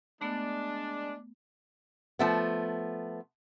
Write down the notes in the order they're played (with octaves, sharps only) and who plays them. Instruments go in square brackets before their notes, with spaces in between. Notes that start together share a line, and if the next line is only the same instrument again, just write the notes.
[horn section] G#3 D4 [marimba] A3 B3
[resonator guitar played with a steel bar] F3 A3 B3